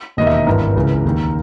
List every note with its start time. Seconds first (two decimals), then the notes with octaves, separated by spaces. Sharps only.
0.17 E1 D#2 D#3 D#5
0.27 E5
0.37 D#5
0.47 G#1 G2 E3 A#4
0.76 C#2 C#3 E3
1.05 D#2 D#3